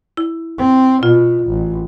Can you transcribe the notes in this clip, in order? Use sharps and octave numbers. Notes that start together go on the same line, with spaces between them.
E4
C4
B2 F4
A1